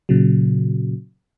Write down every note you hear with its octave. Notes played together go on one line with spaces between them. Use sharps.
A#2 C#3 F#3